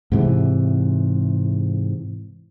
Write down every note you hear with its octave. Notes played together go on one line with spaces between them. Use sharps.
G#2 C3 E3